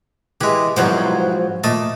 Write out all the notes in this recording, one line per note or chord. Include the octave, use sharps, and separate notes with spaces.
E3 G#3 G4
C2 G#2 B2 F3 F#3 C5
A#2 A3 A4 D#5